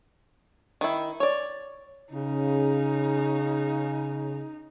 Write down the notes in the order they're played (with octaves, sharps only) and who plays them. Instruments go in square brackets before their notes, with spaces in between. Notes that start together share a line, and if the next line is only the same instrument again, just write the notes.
[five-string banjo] D#3 E4
C#5 D5
[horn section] C#3 [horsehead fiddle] D#4